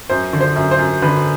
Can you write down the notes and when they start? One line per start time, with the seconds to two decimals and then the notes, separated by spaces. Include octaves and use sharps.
0.10 F#2 C5
0.33 D3
0.41 C5
0.56 F#2
0.71 C5
0.79 F#2
1.02 D3 B4